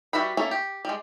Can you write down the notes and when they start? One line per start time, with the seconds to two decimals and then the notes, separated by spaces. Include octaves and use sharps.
0.13 G3 F#4 B4 E5 B5
0.37 A3 A#3 C#4 A4
0.51 G4
0.85 G3 G#3